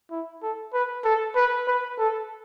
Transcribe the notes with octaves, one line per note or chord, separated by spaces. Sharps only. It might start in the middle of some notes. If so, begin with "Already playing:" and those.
E4
A4
B4
A4
B4
B4
A4